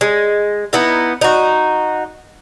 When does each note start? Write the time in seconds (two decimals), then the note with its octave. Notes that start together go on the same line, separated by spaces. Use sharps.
0.01 G#3
0.73 B3 D#4 E4
1.21 D#4 F#4